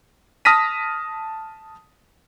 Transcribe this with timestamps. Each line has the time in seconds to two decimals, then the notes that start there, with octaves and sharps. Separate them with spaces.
0.45 A5 D#6 F6 A#6 B6 D#7